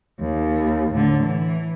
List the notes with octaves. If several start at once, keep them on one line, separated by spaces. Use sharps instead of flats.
D#2
A2 D3
E3